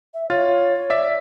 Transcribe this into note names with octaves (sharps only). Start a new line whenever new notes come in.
E5
F4 C#5 F6 A6
D5 E5 B6